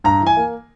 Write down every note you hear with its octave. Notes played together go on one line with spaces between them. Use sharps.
G2 A#5
E3
G#5
A#3